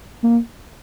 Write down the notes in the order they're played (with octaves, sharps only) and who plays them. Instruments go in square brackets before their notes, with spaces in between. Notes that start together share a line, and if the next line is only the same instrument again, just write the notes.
[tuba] A#3